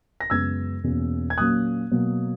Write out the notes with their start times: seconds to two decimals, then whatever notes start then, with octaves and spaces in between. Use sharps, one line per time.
0.20 A#6
0.30 F#2 C#3 G#3 B3 E6 G#6
0.84 E2 B2 A#3 C#4
1.30 G#6
1.38 A#2 F#3 A#3 C#4 D#6 F#6
1.91 B2 F#3 A#3